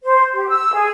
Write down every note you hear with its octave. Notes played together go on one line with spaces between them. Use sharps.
C5
G4
E6
G#4